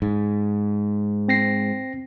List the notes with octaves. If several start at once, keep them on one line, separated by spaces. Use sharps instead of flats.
G#2
C4 A#6 C7